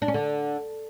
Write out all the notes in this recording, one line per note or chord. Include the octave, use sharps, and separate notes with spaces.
D4
C#4
D3